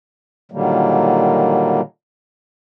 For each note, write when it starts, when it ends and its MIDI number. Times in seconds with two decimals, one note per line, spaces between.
0.52 1.81 46
0.52 1.81 50
0.52 1.81 51
0.52 1.81 54
0.52 1.81 55
0.52 1.81 58